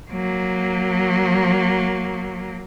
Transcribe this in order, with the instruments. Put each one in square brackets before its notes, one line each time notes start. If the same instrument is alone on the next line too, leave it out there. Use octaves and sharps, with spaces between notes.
[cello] F#3 A#3